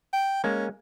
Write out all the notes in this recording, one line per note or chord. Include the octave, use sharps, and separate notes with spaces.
G5
G#3 A#3 C#4